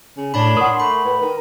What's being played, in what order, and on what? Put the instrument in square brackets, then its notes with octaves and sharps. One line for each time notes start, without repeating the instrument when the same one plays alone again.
[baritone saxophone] C#3
[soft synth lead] A2 [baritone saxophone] D4 [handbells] C#5 A5 B5
[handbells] A#4 [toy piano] F#5 C#6 D#6 [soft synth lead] C6
[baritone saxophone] A3 [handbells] B5
[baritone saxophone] A2 [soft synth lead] B4
[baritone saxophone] D#3 [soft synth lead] A#4